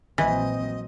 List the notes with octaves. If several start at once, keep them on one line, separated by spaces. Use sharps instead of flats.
A#1 E3 F#3 C4 D#5